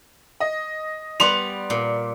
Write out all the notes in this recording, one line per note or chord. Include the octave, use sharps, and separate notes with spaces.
D#5
G3 B3 F#5 C6 F7
A#2